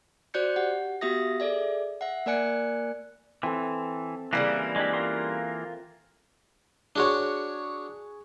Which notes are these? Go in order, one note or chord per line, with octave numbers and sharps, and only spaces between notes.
F#4 C5 D5 F#6 G6 C#7
G4 F#5
B3 F#4 G4 E5 D#6 A#6
G#4 A4 D5 E5
E5 F#5
A#3 A#4 D5 G#5 F#6 C#7
E3 C4 A4
C#3 E3 G3 A#3 E4
G#3 D4 G4
F4 A#4 C6
D4 F#4 G#4 C#5 C#6